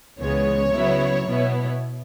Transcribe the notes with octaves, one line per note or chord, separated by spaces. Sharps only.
C#2 C#3 E3 G#3 B3 C#5
C#3 F#3 B3 E4
B2 B3 E4